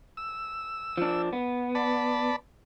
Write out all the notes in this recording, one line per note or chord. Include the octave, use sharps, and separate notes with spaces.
E6
F3 D4
B3
D5 A5 B5